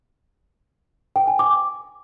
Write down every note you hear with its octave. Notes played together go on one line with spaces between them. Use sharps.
G5
G#5
D6